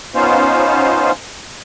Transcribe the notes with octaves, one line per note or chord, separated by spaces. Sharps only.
B3 C#4 D#4 F4 C5 F5